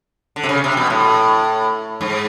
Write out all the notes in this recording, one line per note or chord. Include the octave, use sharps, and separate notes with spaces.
D3
C3
C#3
C3
B2
A2
G#2